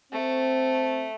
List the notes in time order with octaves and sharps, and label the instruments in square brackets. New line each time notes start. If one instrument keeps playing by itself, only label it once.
[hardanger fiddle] A3 [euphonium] C4